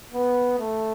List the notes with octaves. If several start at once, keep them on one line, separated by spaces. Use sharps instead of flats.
B3
A3